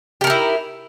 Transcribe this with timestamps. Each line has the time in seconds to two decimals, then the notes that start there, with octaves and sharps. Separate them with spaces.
0.21 G4
0.24 A#4
0.27 D#4
0.30 E4